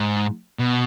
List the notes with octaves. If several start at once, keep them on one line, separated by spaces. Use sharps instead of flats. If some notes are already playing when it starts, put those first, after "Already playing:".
Already playing: G#2
B2